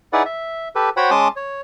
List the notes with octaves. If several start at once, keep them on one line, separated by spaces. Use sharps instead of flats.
D#4 E4 G#4 B4 D5 F#5
E5
G4 A4 B4
F#4 C5 C#5 F#5 G5 B5
G#3 C#4 A5 C6 D6 D#6
C#5